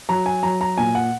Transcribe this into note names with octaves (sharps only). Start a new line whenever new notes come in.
F#3 A#5
G#5
F#3 A#5
A#5
A#2 G#5
F#5